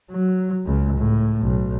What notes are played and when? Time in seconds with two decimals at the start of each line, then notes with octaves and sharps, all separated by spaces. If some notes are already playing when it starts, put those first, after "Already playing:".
0.12 F#3
0.67 C#2 C#3
0.97 A2
1.42 B1